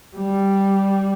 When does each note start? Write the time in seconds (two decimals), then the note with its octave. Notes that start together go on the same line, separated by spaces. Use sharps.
0.17 G3